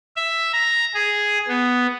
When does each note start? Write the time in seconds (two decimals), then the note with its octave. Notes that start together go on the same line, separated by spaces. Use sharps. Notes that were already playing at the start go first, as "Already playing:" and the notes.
0.16 E5
0.53 A#5
0.94 G#4
1.48 B3